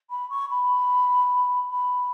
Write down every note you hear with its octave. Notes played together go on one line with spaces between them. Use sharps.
B5
C#6
B5
B5